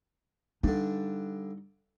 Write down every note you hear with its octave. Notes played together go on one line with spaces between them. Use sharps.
G2 D3 D#4